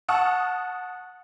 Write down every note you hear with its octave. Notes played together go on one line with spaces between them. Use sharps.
F#5 A5 C#6 D#6 F6